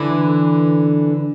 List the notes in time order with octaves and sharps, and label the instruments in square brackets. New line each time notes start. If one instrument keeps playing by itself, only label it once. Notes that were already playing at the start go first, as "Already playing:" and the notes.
Already playing: [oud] D3 E3